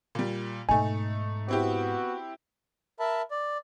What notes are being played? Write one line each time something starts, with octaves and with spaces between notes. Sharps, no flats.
A#2 G3
G#2 B2 A3 D#4 G#5
B3 C4 E4 F#4 G4
A#4 E5 A5 B5
D5